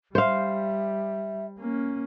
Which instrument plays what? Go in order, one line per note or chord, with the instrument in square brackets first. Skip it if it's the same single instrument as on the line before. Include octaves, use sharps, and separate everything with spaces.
[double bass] G3 [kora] C5 F5 [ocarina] E5
[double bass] A#3 C#4